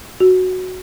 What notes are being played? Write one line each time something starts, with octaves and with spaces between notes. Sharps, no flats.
F#4